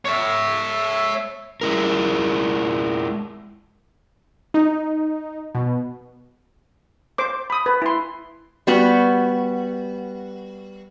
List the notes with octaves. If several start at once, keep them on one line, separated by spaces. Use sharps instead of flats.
C#5 E5
G#3 E4 A#4
D#4
B2
C5 D6
B5 D#6
B4
E4 C6
G3 B3 F#4